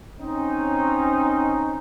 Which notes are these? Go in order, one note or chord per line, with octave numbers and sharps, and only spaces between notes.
C4 C#4 D#4